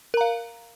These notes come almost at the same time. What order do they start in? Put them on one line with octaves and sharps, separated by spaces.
A#4 A#5 F5